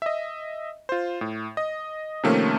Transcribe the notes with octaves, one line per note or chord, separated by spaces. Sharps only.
D#5 E5
F4 C5
A2
D#5
C3 D#3 F3 A3 A#3 C#4